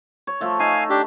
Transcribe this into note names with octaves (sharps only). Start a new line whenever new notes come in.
C#5
F3 A3 A4
D#4 F5 G#5
D4 G4